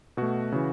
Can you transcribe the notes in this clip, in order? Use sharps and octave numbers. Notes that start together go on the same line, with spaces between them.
B2 A3 F#4
C#3 E3